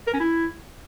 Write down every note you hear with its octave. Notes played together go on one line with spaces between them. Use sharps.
A#4
C#4
E4